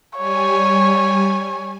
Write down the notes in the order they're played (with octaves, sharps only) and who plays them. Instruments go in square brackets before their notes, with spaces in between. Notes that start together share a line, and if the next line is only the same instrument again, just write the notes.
[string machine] G3 G#5 [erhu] C#5